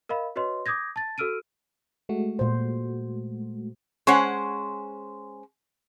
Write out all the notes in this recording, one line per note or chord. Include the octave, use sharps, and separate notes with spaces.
A#4 D#5 F5 B5
F#4 B4 C#5 D#5 C6
D6 D#6 G6 G#6 A#6
A5 A6
F#4 A4 E6 F6 D7 D#7
G#3 A3 F#4
A#2 C5
G#3 C#4 C5 F#5